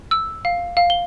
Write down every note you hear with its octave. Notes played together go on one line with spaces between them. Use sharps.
E6
F5
F5
G7